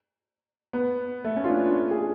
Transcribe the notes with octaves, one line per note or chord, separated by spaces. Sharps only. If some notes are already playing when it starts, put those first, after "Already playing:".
B3
A3
C#4
F4
D4
G#4